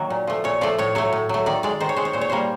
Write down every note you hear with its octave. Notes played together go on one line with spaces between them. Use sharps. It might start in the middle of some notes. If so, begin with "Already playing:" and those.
Already playing: D#3 F#3 A#3
A#2
F3 A3
A#2 C#5
F3 A3 D5
A2 C#5
F#3 A3 C#5
A2
F#3 A3
D#3 D5
G#3 D5
D#3 C5
C#5
G#3 C5
C#5
A#2 C5
C#5
G3 A#3 C5